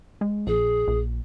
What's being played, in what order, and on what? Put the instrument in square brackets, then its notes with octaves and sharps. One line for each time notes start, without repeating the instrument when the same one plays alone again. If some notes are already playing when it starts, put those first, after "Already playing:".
[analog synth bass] G#3
[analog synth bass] A#1 [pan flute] G#4
[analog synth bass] A#1